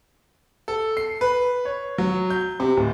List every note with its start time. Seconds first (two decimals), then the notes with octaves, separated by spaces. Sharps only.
0.68 A4
0.97 C7
1.21 B4
1.65 C#5
1.98 F#3
2.30 G6
2.60 C3
2.77 D1